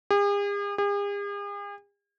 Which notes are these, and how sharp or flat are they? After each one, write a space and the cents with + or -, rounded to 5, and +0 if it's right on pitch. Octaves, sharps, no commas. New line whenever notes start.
G#4 -45
G#4 -45